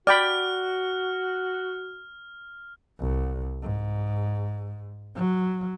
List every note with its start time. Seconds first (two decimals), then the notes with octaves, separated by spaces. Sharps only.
0.07 F#4 D5 G5 B5 F6
2.99 C2
3.62 G#2
5.16 F#3